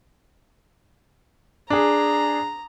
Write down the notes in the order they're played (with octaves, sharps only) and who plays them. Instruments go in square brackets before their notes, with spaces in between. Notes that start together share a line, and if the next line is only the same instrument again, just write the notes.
[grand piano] D4 G#4 [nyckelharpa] A#5